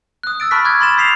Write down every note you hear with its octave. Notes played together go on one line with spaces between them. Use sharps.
D#6 F#6
E6 A6 D7
A5 B5 C#6 F6 F#6 B6
C#6 D6 F6 F#6 G#6
B5 C6 A6 E7
D#6 G6 B6 C7 E7 F7